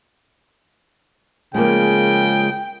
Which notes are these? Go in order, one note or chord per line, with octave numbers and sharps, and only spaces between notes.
C#3 F3 G#3 A#3 G5